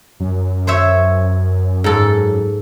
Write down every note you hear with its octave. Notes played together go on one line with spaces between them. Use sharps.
F#2
C5 C#5 E5
G#2 A4